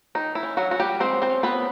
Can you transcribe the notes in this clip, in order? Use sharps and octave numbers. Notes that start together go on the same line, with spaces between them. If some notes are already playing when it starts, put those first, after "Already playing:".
D#3 D#4
E4
C#4
F#3 F#4
C#4 F#4
G3 G4
G#3 C4 C5
C4 C5
C#4
B3 B4